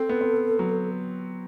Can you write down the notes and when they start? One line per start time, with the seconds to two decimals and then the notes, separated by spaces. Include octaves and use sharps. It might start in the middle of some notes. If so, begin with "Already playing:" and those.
Already playing: C4 A4
0.09 B3
0.21 C4
0.59 F#3